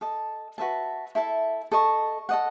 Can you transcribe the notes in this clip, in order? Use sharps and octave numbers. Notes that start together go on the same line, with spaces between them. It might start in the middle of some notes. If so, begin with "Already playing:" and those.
A4 D#5 A5
F#4 B4 E5 A5
E4 A4 E5 A5
A4 D#5 A5 C#6
A4 D#5 F#5